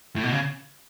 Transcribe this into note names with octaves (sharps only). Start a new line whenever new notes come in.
A2
B2
C#3